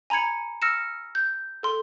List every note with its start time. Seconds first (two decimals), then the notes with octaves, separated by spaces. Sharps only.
0.10 G#5 A#5 B5 G#6 C#7
0.62 E6 F6 A#6 C#7 E7
1.15 G6
1.63 A4 C6